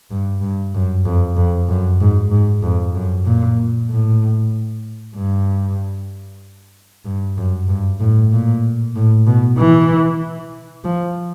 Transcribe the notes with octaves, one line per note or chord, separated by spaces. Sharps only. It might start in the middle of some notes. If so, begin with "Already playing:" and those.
G2
G2
F#2
F2
F2
F#2
G#2
G#2
F2
F#2
A#2
A2
G2
G2
F#2
G2
A2
A#2
A2
B2
E3
F3